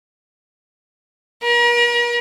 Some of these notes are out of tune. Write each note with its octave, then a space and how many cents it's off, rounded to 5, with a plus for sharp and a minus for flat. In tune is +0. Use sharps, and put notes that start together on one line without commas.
A#4 +40